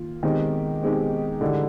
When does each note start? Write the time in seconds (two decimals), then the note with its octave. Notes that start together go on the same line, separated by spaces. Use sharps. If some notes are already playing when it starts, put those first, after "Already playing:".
Already playing: D#3 A#3 F4
0.23 B2 D#3 G#3 C4 D#4 G4
0.82 B2 G#3 C4 D#4 G4
1.41 G#2 D3 E3 G3